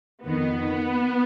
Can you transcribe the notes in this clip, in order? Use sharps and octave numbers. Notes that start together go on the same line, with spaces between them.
F2 D#3 B3